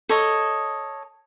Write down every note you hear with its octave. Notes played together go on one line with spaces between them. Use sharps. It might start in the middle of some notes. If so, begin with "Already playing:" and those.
A4 C#5 D#5